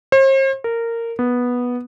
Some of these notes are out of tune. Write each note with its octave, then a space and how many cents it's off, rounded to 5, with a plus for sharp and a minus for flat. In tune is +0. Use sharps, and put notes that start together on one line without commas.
C5 +45
A#4 -15
B3 -10